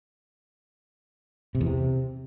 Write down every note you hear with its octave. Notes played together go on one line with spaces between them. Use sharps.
C3
E2
C3